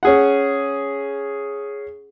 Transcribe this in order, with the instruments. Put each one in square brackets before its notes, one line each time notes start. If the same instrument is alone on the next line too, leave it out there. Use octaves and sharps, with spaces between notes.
[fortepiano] C#4 G#4 F#5